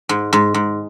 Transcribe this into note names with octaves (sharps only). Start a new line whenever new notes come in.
G#2
G#2
G#2